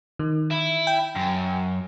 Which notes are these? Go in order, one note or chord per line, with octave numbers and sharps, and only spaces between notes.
D#3
E4
G5
F#2